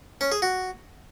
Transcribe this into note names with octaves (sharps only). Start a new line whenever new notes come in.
C#4
G#4
F#4